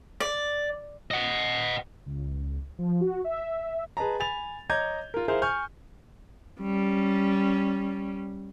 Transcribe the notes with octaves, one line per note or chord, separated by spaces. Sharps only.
D5
D#5 F#5
C#2
F3
F#4
E5
G#4 B4 D#5 A5 A#5
G#5 B5 A6 F7
C#5 D#5 A#5 D6 G6 G#6
F4 A#4
E4 G#4 A#4 C5 E5 F5
G#5 C#6 F6 G6
G3 C#4